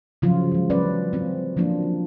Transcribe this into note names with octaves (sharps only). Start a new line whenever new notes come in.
C#3 F3 F#3 F4
E3 G#3
F#3 C#4 B4 D5
C4 F4
F3 F#3 A#3 D4 F4